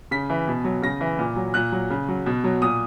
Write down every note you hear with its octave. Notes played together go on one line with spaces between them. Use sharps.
C#3 B6
E3
B2
F#3
C#3 A#6
E3
A#2
F#3
A#2 F#6
F#3
C#3
F#3
B2
F#3
A#2 D#6